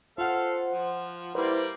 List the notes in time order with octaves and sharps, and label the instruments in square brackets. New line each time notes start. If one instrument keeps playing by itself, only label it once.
[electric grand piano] F4 F#5 [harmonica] A4 F5 [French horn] C5
[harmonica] F3
[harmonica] G3 A#3 D5 [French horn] E4 [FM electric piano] B4 C5